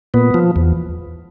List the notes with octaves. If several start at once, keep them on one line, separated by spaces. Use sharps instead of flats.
A#2 B3
F3
E2